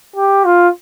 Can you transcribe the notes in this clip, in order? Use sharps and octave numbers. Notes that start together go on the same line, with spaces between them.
G4
F4